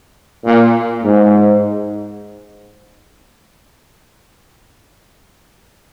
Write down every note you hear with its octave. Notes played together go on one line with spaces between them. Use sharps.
A#2
G#2